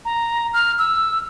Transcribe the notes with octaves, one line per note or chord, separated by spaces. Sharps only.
A#5
F6
E6